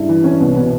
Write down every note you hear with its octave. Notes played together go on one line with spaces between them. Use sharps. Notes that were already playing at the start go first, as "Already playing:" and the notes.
Already playing: G2 C#3 E4
E3
E3 C#4
C2 B3
B2 B3